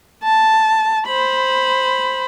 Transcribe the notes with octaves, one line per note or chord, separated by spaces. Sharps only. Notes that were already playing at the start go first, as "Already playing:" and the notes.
A5
C5 B5